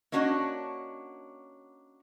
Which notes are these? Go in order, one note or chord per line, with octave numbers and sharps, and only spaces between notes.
A#3 C#4 D4 F#4 C#5 D#5